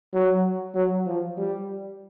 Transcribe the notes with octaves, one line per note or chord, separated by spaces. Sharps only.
F#3
F#3
F3
G3